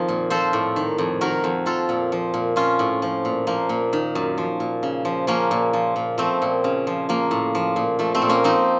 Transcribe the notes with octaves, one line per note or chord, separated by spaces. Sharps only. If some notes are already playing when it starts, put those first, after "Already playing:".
Already playing: F2 D#3 F3 D#4
A#2
F3 A4 C5
A2
D#3
F2
D#3 F#4 A#4
F2
F3 F4 A4
A#2
F3
A#2
F3 C#4 F4
A2
F3
A#2
F3 A#3
A#2
D#3
F#2
F3
A#2
C#3
F3
F3 A#3 C#4
A#2
F3
A#2
F3 A3 C4
A#2
C#3
F3
F3 A#3
A2
F3
A#2
F3 A3
A3 C4
A#2
A#3 C#4
F3 C4 D#4